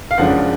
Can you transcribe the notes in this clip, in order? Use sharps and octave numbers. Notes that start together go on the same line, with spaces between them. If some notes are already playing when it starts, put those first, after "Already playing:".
F5
F#1 F#2 F3 G#3 D4 F#5